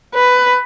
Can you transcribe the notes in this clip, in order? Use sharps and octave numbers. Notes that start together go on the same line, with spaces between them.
B4